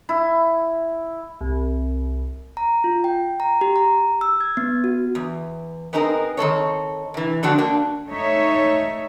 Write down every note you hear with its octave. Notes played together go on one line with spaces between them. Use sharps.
E4
C2
A#5
F4
G5
A#5
G4
A#5
E6
G#6
B3
F#4
E2
B3 C4 D#4 G#4 A#4
D#3 C4 A4 C#5
C3 E3
D3 F3 C4 D4 F#4
A#3 C4 D4
A3 D#4 C#5 E5